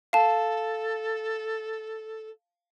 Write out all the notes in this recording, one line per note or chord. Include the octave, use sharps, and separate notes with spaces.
A4 F5 A5